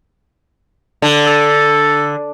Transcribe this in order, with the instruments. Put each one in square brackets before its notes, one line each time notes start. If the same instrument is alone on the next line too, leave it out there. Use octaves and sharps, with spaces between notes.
[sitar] D3
[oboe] A4